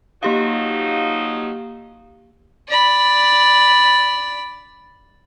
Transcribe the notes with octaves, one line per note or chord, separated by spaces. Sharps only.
F3 F#3 A#3 D#4 G4 F5
D5 B5